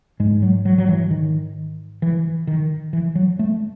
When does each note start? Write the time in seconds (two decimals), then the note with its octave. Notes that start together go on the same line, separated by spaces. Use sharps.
0.20 G#2 G#3
0.42 F#3
0.65 F#3
0.78 F#3
0.88 E3
1.11 D#3
2.02 E3
2.47 D#3
2.93 E3
3.15 F#3
3.39 A3